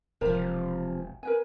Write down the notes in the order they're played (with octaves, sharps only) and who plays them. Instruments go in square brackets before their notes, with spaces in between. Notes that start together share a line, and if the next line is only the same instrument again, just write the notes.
[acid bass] E1 [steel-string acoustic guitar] C3 F3 [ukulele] A#4 C5 A#5
[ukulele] A#4 B4 G#5